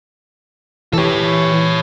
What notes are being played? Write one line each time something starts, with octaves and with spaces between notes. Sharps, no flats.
E3 G4 A4 C#5